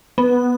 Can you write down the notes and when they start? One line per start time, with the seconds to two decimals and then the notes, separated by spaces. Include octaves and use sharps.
0.18 B3